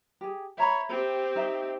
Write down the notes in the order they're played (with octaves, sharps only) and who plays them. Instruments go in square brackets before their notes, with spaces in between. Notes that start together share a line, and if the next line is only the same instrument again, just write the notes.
[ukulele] G4 G#4
[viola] C#5 [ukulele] E5 A#5 B5
[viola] C4 G4
[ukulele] D#4 E5